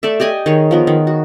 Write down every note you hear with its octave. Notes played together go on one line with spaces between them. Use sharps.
A3 A4 D5 E5
G4 D5 D#5 G#5
D#3 G#4 C#5
F3 B3 A#4
D#3
F#4